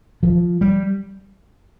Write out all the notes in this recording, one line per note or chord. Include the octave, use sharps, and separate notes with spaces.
F3
G3